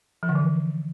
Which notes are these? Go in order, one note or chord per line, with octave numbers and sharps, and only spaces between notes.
F3
D3
E3
D3